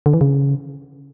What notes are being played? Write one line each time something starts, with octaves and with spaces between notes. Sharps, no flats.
D3
E3
C#3